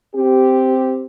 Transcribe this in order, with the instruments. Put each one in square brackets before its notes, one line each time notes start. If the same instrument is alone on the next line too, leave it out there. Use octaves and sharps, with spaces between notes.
[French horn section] C4 G4